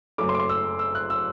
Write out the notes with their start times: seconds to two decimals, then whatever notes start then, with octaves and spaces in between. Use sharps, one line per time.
0.18 F#1 F#2 F#3 A3 D6
0.29 C6
0.34 D6
0.39 C6
0.49 E6
0.79 E6
0.95 F#6
1.10 E6